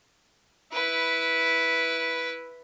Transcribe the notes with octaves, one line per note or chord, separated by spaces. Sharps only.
E4 B4